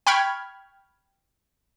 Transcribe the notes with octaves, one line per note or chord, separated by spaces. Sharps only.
G5 B5 C#6 F6 G#6